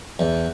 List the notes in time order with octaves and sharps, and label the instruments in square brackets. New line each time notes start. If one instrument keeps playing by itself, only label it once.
[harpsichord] E2